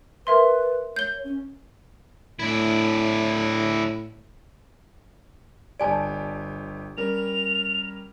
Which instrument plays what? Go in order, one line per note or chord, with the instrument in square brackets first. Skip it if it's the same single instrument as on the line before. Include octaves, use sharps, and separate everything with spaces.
[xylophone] A#4 E5 C6 [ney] B4
[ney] C#5 [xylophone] G6 G7
[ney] C#4
[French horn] A2 [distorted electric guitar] D4 E4
[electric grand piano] G1 G4 D7 [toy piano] D5 G#5 A5
[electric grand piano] G3 C#4 A#4 [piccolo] F7